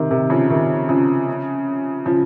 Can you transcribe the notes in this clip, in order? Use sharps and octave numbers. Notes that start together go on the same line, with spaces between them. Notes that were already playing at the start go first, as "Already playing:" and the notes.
Already playing: C3 D#3
C3 D#3
C#3 F3
C3 D#3
C#3 F3
C#3 F3